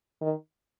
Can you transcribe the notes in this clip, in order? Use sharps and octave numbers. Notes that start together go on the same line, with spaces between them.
D#3